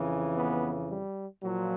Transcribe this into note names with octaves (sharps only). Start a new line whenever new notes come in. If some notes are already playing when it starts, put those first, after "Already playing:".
Already playing: F2 C#3 E3
B3
G3
A#2 F3 F#3